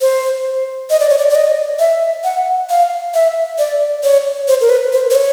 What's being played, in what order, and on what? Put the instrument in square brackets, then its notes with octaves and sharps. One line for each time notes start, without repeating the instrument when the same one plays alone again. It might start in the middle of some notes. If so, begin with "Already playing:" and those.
[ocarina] C5
D#5
D5
C#5
D5
D5
D#5
E5
F#5
F5
E5
D5
C#5
C5
A#4
B4
C5
C5
C#5